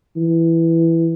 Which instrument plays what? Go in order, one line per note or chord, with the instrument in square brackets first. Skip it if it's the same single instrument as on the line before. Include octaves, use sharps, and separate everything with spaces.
[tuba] E3